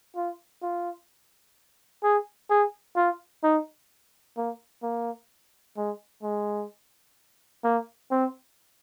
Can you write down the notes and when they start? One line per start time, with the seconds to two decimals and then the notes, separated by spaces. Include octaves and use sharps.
0.16 F4
0.62 F4
2.03 G#4
2.50 G#4
2.96 F4
3.43 D#4
4.37 A#3
4.83 A#3
5.77 G#3
6.23 G#3
7.64 A#3
8.11 C4